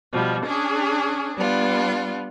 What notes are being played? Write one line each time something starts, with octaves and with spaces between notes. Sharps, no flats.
B2 F3 G3
C#4 D4 G#4
G3 B3 D4 F4